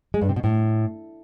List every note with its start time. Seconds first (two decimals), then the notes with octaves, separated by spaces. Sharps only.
0.14 G#3
0.21 G2
0.29 C3
0.36 B2
0.44 A2